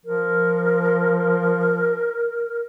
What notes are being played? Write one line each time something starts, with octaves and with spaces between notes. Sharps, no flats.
F3 A#4